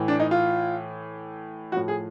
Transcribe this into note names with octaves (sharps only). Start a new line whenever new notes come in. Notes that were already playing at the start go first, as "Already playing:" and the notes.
Already playing: A2 E3
D4
D#4
F4
A2 F3 F#4
G#4